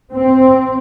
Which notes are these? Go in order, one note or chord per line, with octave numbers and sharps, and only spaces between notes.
C4